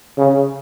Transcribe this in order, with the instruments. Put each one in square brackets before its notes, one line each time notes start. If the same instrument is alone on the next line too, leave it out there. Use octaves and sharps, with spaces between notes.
[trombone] C#3